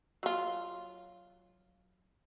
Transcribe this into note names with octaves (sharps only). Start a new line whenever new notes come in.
F#3 F4